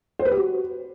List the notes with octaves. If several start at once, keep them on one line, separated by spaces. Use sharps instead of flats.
C5
B4
G4
F#4